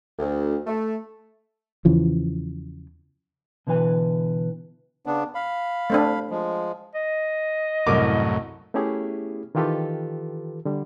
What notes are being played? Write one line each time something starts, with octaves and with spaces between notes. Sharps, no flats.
D2
A3
E2 C#3 E3 F3
B2 D3 E3 B4 G#5
C#3 B3 D4
F5 B5
A3 C4 D4
F3 G#3
D#5
C2 F#2 A2 A#4 D6
A3 B3 C#4 E4 G4 G#4
D#3 E3 F4 G4 A4 B4
D3 G3